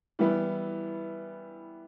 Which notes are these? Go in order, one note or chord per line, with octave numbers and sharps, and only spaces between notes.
E3 G3 B3 E4